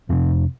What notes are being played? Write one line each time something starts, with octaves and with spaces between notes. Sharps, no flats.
F2 C3 C4